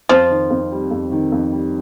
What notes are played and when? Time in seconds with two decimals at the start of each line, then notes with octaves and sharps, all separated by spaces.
0.09 F2 F3
0.30 D#3
0.50 F2
0.71 G3
0.91 F2
1.12 D#3
1.32 F2
1.52 G3